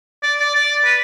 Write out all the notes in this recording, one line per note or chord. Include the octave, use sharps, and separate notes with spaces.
D5
D5
D5
B4